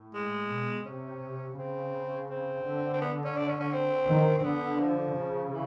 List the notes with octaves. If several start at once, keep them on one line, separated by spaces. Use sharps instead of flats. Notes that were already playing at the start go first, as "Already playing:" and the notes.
Already playing: A2
G#3
B2
C3 C#4
C#3 C4
C4
D3
C4
B3
C#4
D4
C#4
C#4
C4
D#3
C4
D3 B3
F3
C#3
E3